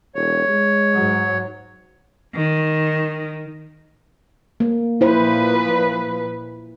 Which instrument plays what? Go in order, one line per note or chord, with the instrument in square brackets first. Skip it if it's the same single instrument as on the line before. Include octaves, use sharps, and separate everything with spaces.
[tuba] E1 [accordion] C#5
[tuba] G#3
[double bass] G#2 F#3
[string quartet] D#3
[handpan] A#3
[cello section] A#2 F3 B4 [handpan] E4 C5